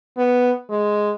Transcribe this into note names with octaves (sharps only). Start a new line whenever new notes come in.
B3
G#3